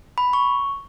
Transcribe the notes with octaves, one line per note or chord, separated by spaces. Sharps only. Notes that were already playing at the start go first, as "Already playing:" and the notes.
B5
C#6